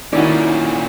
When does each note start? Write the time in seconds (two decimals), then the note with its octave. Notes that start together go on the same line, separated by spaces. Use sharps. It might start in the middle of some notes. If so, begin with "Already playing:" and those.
0.13 A#2 D#3 C#4 E4 F#4 D5